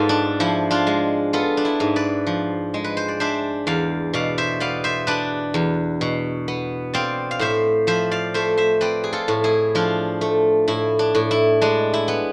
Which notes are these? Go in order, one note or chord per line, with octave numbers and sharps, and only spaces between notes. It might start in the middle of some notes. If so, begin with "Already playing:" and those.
Already playing: G#2 B3 F4 A4 B4 D5
D4
F3 E4
D4 F4
G#3
B3 F4 A4
D4
E4
G#2
B4 D5
F3
G#3
B4
C5
D5
D4 C5 E5
E2 D5 F5
B2 D5 F5
C5 E5
B3 D5 F5
C5 E5
D4 B4 D5
E2
B2
B3
C4 D5 F5
F5
A2 C5 E5
F3 C5 E5
D5 F5
A3 C5 E5
C5 E5
C4 B4 D5
G#4
F4 A4
A2
E4 G#4
F3 D4 F4
A3
A2 E4
D4
A2
E4
G#3 D4
E4
B3